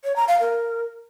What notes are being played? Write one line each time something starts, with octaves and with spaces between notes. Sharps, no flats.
C#5
A#5
F5
A#4